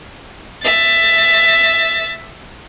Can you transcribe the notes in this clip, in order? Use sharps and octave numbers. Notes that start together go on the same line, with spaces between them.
E5 A6